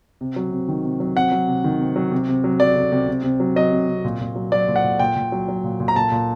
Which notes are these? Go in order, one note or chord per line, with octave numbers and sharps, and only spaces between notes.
C3
F#3
C3
D#3
C3
F#3
C3 F#5
F#3
C3
D#3
C3
F#3
C3
C3
F#3
F#3 D5
C3
C3
C3
C3
F#3
F#3 D#5
C3
C3
A#2
A#2
F#3
F#3 D5
A#2
F#5
A#2
A#2 G5
A#2
F#3
F#3
A#2
A#2
A#5
A#2 A5
A#2